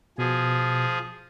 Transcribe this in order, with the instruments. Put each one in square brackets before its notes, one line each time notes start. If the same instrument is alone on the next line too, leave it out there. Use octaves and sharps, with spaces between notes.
[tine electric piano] B2 [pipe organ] F3 G#4